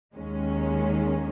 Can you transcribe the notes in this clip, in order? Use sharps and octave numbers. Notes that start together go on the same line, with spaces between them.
D#2 D#3 G#3 C#4